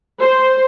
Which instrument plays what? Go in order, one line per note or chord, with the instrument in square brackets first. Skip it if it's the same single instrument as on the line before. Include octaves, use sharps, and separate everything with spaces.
[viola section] C5